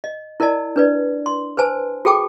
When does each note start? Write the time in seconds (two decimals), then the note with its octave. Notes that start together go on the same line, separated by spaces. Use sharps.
0.04 D#5
0.40 E4 A#4 D5 D#5 A5
0.76 D4 B4 D5
1.26 C6
1.57 B4 C5 G#5 A5
2.05 F#4 G#4 A4 G5 A5 D6